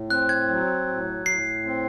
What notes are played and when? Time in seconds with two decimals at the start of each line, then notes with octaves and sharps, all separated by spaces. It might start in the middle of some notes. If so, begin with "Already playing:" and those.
Already playing: A2
0.10 C4 F#6
0.29 G#6
0.49 F#3
0.87 A2
1.26 A2 C7
1.65 C4